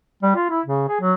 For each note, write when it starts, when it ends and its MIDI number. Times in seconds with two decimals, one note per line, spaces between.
0.23 0.32 55
0.35 0.47 65
0.49 0.60 64
0.65 0.84 49
0.88 0.99 68
1.01 1.14 54